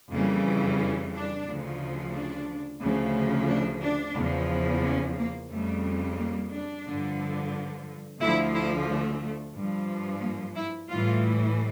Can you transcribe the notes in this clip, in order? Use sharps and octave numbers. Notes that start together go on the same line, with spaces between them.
F2 C#3 E3 G3 A#3
C#4
D4
D2 C#3 F3
D4
D2 C#3 F3
D4
D4
E2 C#3 F3
C#4
A#3
F2 C#3 G3 A3
A#3
D4
G2 D3 F3
D2 D3 F3 E4
E4
A3
G2 F3
A#3
E4
A2 E3 G3 F4